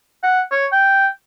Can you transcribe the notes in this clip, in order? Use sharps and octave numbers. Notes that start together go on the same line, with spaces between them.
F#5
C#5
G5